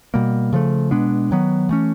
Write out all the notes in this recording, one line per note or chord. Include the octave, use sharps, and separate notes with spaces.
B2 G3 A#3
C#3 F3 A3
B2 G#3 B3 D4
D#3 F#3 B3
E3 A3 C#4